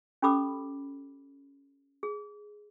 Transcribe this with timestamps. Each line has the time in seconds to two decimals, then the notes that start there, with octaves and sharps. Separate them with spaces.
0.22 C#4 G4 A4 B5 D6 E6
2.03 G#4